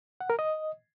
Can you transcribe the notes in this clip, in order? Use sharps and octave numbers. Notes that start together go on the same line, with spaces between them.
F#5
A#4
D#5